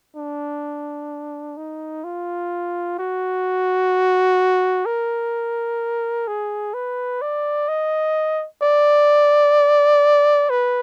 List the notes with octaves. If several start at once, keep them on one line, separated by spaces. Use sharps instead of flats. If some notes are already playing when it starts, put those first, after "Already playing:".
D4
D#4
F4
F#4
A#4
G#4
B4
D5
D#5
D5
B4